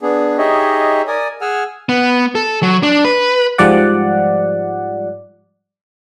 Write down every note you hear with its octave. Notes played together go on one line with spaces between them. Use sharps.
B3 D4 G#4
D#4 G4 G#4 C#5 D#5 E5
A#4 D5 G#5 D#6
G#4 F#5 G#5 E6 F6
B3
A4
F#3
D4
B4
G#2 F3 G3 D5 F#5